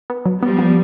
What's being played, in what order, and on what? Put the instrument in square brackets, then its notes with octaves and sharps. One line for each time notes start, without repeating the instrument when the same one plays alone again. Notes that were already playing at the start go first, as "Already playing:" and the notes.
[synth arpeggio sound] B3
F#3
[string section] F3 G3 [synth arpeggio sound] B3
[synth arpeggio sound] B3